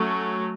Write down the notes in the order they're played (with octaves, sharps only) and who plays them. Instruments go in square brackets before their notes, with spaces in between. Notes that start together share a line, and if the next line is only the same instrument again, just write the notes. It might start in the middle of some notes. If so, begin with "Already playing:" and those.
Already playing: [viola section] F#3 A3 C#4